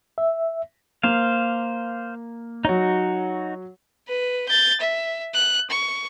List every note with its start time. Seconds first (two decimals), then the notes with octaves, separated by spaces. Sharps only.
0.18 E5
1.03 A#3 C5 F5
2.65 F#3 D#4 F#4 C#5
4.08 B4
4.49 G6 A6
4.81 E5
5.34 F#6
5.70 C#6